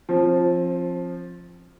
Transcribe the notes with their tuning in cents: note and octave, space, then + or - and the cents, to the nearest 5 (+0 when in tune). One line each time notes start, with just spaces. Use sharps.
F3 +0 C4 +25